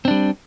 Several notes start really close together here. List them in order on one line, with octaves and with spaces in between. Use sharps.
C4 D4 G3